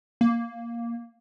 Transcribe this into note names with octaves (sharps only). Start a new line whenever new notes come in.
A#3